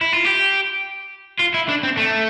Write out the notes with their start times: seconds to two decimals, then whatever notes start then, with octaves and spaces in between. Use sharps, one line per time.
0.01 E4
0.13 F4
0.25 G4
1.40 F4
1.54 E4
1.69 D4
1.83 C4
1.98 A3